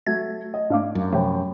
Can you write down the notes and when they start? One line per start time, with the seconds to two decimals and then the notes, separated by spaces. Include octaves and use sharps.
0.06 F#3 A3 G#6
0.54 D#5
0.70 G#2 A3 D4 F5 D6
0.95 F#2
1.13 C3 F3 A3 C#5 G5 B5